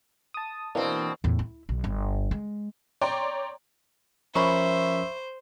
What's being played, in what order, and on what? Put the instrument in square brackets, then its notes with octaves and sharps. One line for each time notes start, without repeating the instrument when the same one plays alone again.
[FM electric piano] A5 D#6
[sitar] B2 C4 [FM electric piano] E3 A#3 D4
[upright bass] E2 A2
E4
B1
G1
G#3
[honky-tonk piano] C#5 D5 G5 A#5 C6
[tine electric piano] F3 C#4 A#4 [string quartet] C5 [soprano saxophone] E5 [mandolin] B5 C#6